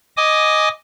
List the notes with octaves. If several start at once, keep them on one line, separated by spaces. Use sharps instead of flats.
D#5 G#5 D6 D#6